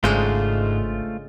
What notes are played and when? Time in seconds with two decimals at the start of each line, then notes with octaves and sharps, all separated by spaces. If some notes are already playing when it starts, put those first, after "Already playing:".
0.04 G#1 G#2 C#3 G#3 A3 D4 F4 C5